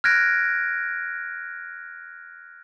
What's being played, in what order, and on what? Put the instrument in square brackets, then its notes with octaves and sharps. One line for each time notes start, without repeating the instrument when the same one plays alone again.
[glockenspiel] F6 F#6 G#6 A#6 D7